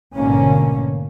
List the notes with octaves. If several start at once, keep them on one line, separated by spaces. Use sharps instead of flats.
A1 G#2 B2 D3 A#3 C#4